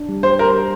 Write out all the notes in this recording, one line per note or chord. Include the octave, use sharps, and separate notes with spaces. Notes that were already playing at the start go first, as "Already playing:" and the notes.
Already playing: D4
G3
G4 C5
A#4 C5
G4